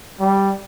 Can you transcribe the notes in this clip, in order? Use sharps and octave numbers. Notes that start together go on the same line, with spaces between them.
G3